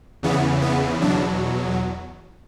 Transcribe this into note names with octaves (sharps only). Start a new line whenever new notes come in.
E2 C#3 E3 B3
B3
E2 B2 F#3 D4